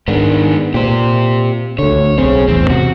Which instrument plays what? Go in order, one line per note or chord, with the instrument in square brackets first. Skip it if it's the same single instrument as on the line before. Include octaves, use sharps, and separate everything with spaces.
[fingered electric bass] G#2 D#3 [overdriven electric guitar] B3 D4
[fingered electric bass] A#2 [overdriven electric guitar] G4 C5
[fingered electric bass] D2 D3 [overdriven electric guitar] C#5
[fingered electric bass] B1 C4 [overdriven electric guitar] G#4 C#5
[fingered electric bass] A1 E2 [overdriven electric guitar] C4
[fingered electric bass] C3 [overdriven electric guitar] F#4